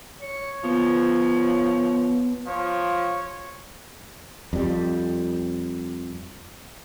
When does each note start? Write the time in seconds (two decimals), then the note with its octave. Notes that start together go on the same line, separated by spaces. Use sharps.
0.21 C#5 C#7
0.64 F3 B3
2.47 F3 C#5
4.53 F2 G3